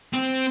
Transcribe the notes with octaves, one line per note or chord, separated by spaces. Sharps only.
C4